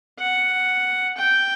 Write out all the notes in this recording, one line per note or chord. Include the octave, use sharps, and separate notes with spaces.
F#5
G5